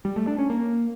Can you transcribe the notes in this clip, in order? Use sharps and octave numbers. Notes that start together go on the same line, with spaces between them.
G3
A3
D4
C#4
A#3